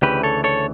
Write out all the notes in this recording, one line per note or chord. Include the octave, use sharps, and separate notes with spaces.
D2 C#3 E3 G4 B4
A4 C#5
A4 C#5